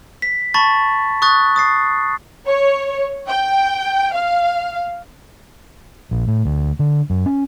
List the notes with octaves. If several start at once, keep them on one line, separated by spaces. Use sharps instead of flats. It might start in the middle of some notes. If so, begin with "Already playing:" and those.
B6
A5 B5 C#6 A6
C#6 D#6 F#6 A6
D#6 A6 C7
C#5
G5
F5
A#1
A2
D2
D3
F#2
C#4